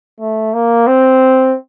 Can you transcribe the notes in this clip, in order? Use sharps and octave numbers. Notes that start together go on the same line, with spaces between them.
A3
A#3
C4